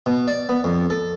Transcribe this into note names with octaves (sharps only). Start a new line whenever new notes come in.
B2
D5
B3
F2
A4